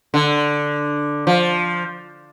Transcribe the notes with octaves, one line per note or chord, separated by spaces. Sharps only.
D3
F3